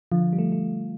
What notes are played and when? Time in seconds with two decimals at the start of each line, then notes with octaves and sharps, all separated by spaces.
0.12 D3 F3
0.33 G3
0.38 A3
0.52 A3